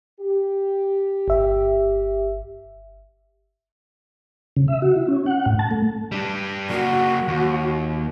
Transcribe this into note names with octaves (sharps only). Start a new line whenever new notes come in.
G4
G1 E5
C#3
E5
F#4
E4
C#4
F#5
A2
A5
A3
G3 D4
F#3 A#3 F#4
D#2